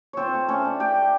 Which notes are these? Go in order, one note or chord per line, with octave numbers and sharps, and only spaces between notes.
C4 F4 C5 C#5
A3
A3 C#4 C#5
D4
A3 G4 G5
A3